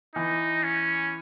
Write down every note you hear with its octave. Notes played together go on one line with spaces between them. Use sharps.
E3 D#4
C#4